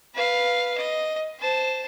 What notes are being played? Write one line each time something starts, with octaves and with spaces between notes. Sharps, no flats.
B4 F5
D#5
C5 A5